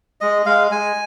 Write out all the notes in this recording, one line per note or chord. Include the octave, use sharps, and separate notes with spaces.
G#3 D#5
G#3 F5
G#3 G#5